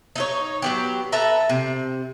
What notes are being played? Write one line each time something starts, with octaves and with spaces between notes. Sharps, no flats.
D#4 E4 C#5
F#3 B3 G4
A4 B4 E5 A#5
C3